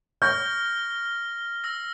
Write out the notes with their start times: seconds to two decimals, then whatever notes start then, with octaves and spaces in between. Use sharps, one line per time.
0.22 C#6 F6 G6 A#6 G7
1.64 E6 A#6